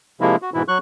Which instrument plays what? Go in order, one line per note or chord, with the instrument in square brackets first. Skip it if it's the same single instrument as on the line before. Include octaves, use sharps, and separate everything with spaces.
[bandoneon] C3 F3 G#3 A#3 E4
F#4
G#2 B2 E3 E4
F#3 C#6 F#6